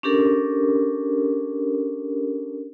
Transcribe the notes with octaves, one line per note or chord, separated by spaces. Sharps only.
C#4 D4 G4 A4 A#4